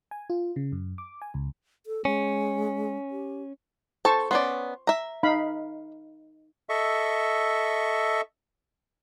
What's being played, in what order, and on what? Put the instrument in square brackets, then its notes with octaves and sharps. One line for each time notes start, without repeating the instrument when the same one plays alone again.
[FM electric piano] G#5
F4
C#3
F#2
D6
G#5
C#2
[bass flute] A4
[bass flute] G#3 [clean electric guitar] C#4
[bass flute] G4
[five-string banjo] A4 A5 [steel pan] C5 C#6
[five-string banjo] B3 C#4 D5 [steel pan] C6
[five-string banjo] E5 A#5
[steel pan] D#4 F5 B5
[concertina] A4 D#5 E5 C#6